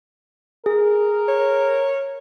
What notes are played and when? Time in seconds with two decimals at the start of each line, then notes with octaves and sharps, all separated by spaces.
0.66 G#4 A#4
1.28 C#5